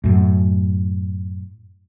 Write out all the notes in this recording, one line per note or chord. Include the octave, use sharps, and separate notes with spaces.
F#2 A2